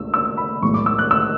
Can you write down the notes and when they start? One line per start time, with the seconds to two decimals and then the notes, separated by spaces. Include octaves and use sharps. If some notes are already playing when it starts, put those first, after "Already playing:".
Already playing: C#2 B2 A3 D4 E6
0.14 E6
0.37 B5
0.62 B1 A2 E3 G#3 C#6
0.74 D6
0.86 E6
0.99 F#6
1.11 E6